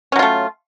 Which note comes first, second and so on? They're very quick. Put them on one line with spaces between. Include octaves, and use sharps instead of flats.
C#4 F#3 F4 A3